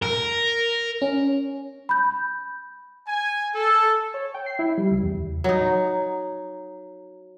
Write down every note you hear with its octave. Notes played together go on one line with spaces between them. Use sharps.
A#4
C#4
B5 G6
G#5
A4
C#5
G5
C7
E4
G3
C#2
E2
F#3 D#4